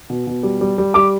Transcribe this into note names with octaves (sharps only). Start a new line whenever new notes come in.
B2
B2
G3
G3
G3
G3 D6